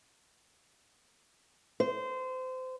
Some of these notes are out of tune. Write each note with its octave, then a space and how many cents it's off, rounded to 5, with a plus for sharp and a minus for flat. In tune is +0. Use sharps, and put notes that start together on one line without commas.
C5 -25